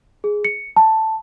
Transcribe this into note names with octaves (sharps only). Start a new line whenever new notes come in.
G#4
C#7
A5